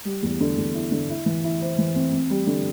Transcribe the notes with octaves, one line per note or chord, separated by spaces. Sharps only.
G3
E2
D3
E2
E4
D3
E4
E3
E4
C5
E3
C4
C4
G3
D3